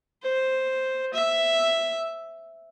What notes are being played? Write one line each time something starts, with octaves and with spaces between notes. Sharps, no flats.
C5
E5